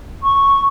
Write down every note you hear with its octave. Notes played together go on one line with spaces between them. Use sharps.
C#6